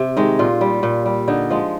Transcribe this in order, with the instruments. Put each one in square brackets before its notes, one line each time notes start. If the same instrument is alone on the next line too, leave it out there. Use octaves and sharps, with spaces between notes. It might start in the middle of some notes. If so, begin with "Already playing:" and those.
Already playing: [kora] C3
D#3 G#3
A#2 F4
G3
A#2
G3
D3 D#4
F3 G#3